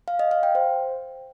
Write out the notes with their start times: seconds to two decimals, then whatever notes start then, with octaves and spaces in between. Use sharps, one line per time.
0.08 F5
0.19 D#5
0.31 F5
0.43 G5
0.55 C5